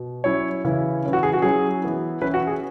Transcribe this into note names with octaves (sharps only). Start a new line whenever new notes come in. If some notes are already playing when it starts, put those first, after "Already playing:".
Already playing: B2
F#3 C#4 E4 C#5
C#3 E3 C#4 E4
E3 C#4 E4
F#4
G#4
F#4
F#3 C#4 E4 G#4
E3 B3 E4
E3 C#4 E4 B4
F#4
G#4